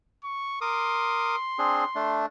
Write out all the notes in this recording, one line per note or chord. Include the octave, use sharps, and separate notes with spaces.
C#6
A#4 C6 D6 D#6
C4 D4 G#4
A3 D4